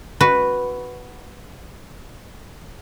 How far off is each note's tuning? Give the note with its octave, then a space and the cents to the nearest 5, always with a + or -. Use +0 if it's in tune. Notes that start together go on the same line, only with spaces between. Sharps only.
F#4 +0 B4 +0